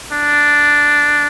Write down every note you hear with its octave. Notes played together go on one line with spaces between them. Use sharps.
D4